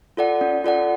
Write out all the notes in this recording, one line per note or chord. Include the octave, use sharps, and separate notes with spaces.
F4 A4 D5 F#5
C#4
F4 A4 D5 F#5